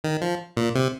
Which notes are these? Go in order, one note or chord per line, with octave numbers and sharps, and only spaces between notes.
D#3
F3
A#2
C3